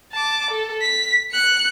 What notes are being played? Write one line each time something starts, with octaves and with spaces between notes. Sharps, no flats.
A5 D6
A4
B6
F#6 C#7